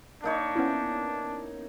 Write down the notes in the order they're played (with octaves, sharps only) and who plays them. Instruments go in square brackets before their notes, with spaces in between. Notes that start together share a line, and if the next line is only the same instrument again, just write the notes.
[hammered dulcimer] A#3 D#4 C#5 [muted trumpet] D4
[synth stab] B3 C#4 E4